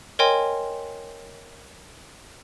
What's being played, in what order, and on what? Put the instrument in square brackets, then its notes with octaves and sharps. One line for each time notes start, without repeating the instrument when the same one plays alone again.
[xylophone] A#4 C#5 D#5 G5 G#5 C6